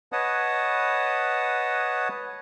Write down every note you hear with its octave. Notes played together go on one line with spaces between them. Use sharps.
B4 C#5 D#5 F#5 A5 D#6